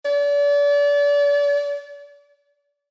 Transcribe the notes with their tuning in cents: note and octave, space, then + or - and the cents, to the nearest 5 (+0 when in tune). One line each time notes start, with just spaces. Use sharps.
D5 -35